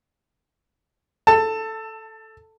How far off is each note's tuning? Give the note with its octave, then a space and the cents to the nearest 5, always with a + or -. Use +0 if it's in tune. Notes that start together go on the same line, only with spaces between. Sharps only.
A4 +0 A5 +20